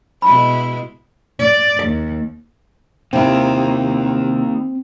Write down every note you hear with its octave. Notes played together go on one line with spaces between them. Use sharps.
B2 G#3 E4 B5
D5
D#2
C3 A#3 C4 D#4 E4 A#4